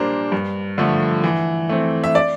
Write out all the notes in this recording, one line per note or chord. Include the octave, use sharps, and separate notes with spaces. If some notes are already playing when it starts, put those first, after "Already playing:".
Already playing: A#2 G3 A#3 D4 A#4 C5
G2
D3 F3 A3
E3
A3 C4
E5
D5